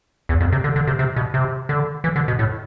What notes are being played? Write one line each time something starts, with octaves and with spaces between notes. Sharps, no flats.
E2
F2
C3
D3
D3
C3
C3
B2
C3
D3
E3
D3
B2
A2